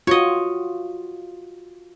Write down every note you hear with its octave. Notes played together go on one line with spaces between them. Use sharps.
F4 F#4 C#5 D#5